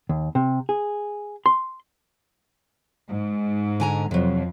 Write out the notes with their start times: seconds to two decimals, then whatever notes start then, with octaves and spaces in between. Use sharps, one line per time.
0.09 D#2
0.35 C3
0.69 G#4
1.46 C6
3.09 G#2
3.80 D3 G#5 A#5
4.11 F2 C3 F#3